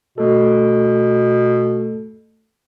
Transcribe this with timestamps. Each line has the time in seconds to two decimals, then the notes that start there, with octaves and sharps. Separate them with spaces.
0.18 B2 A3 A4